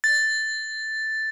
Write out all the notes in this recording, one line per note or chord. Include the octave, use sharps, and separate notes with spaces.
A6